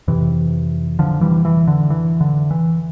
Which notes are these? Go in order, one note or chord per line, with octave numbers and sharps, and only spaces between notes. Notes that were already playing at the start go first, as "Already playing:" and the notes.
F2 C3 E3
D3 F3
E3 G3
E3
D3
E3
D3
E3